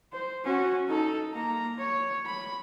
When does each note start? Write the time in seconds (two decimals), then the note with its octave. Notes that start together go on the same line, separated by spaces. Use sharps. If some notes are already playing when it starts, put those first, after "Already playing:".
0.13 C5
0.45 C#4 F#4
0.88 D#4 A4
1.34 A#3 A#5
1.78 C#5
2.26 B5